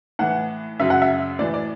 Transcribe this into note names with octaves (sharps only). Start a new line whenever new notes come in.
A2 E3 F#5
F#2 C#3 F#3 E5
F#5
E5
A2 E3 D5
D5